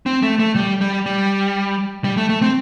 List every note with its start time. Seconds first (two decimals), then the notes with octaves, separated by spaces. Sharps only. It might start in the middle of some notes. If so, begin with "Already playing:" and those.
0.06 C4
0.23 A3
0.39 A3
0.55 G3
0.81 G3
1.06 G3
2.04 G3
2.17 A3
2.29 A3
2.42 C4